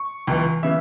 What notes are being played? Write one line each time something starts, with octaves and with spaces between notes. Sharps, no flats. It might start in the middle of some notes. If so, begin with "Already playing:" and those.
Already playing: C#6
C#2 C#3 E3
C#3 E3 E5